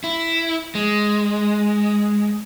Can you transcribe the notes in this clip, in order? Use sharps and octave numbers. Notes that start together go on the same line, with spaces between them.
E4
G#3